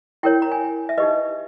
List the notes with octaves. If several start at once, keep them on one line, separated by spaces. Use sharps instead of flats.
E4 A#4 C#5 G5
A#5
G#5
E5
D#4 G4 B4 D#5